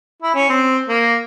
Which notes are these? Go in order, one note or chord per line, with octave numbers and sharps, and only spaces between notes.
E4
C#4
C4
A#3